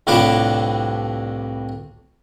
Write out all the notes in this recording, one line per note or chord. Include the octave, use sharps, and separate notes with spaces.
C2 A2 D4 F4 B4 D6